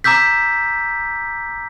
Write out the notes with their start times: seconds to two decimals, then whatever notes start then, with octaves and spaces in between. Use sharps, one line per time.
0.04 A#5 D6 E6 G6 B6